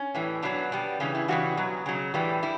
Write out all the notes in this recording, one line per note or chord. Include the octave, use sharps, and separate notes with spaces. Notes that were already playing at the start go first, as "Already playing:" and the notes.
Already playing: C#4
A2 E3 G3
B2 F#3 D4
B2 G3
C#3 E3 G3 C#4
E4
C#3 E3 G3 F#4
B2 F#3
C#3 F#3
A2 E3 G3
G3 E4